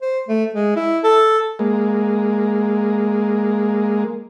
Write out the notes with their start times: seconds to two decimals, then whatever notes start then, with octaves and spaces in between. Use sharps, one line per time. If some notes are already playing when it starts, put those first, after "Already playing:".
0.02 C5
0.29 A3
0.55 G#3
0.76 E4
1.04 A4
1.59 G#3 A#3